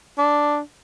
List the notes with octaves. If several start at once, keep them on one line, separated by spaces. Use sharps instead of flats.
D4